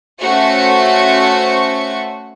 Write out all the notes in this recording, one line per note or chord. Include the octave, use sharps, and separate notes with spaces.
A3 C#4 F#4 C5 C#6 C#7